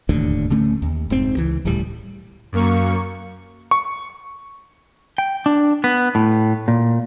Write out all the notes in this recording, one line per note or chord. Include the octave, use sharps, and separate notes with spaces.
E1 D#2 A2 D3
D1 D3 A3 C#4
D#2
F1 G#2 C4
C#2 E3
D#1 C#2 A2 G3
F#2 A#3 C#6
C#6
G5
D4
B3
A2
A#2